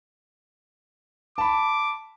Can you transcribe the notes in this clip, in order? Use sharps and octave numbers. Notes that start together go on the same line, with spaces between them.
A5 B5 D6